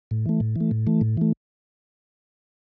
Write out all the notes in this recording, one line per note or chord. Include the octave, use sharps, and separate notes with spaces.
A2
E3 A3
A2
E3 A3
A2
E3 A3
A2
E3 A3